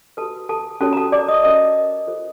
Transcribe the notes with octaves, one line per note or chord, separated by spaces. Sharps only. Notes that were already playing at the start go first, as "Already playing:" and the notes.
F#4 A4 B4 A5
A4 A5
C#4 F#4 A4 A#4 C#5 A5
A#5
A4 A5
D5 D6
D#5 D#6
C#4 F#4 A#4 C#5 D#5 D#6
F4 A4 C5